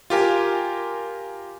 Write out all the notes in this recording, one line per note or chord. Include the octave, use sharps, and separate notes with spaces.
F4 G4 A#4 G#5